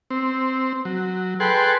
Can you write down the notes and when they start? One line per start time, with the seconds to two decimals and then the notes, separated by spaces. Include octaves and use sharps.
0.10 C4
0.85 F#3
1.40 G#4 A4 B4 G5 C6 F#6